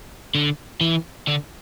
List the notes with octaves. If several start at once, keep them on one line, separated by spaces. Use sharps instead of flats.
D3
E3
D3